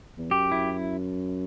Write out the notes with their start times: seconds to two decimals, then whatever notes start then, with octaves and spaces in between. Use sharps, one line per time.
0.18 E2
0.31 F#2 G4
0.52 E4